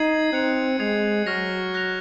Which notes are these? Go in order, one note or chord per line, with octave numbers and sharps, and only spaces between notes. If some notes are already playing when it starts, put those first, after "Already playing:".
Already playing: D#4 G#6 C7 D#7 F#7
C4 F#6 C#7 F7
G#3 D#6 G#6 C7 F7
F#3 C#6 F6 A#6 F7
F#6 A#6 F7